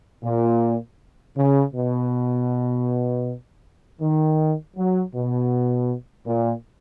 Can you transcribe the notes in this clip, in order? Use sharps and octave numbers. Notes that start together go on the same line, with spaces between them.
A#2
C#3
B2
D#3
F#3
B2
A#2